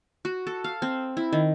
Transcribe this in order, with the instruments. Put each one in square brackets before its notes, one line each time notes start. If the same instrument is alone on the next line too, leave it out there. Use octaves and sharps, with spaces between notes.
[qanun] F#4
A4
F5
C4
E4
D#3